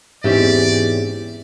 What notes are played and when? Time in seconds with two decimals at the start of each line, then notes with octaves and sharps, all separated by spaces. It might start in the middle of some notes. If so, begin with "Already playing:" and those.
0.24 E2 G#2 C4 C#4 G4 D5 E5